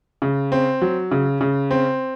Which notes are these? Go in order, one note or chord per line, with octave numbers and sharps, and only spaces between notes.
C#3
C4
F#3
C#3
C#3
C4